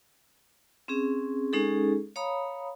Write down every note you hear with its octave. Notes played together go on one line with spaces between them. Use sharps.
C4 C#4 G#4
G#3 C#4 D#4 G#4 A4
C#5 F5 A#5 B5 D#6